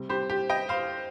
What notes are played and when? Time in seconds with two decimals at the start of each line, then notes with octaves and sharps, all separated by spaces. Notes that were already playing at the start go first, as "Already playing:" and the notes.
Already playing: C3 G3 C4
0.09 G4 C5
0.30 G4
0.50 D#5 G5
0.69 C5 F5